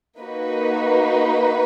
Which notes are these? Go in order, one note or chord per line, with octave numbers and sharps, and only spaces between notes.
A#3 D#4 F#4 B4